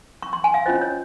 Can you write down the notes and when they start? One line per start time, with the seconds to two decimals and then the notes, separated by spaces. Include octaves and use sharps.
0.22 C#6
0.33 C6
0.44 G#5
0.54 F5
0.66 C#4 F4 C5 D#5
0.81 C#5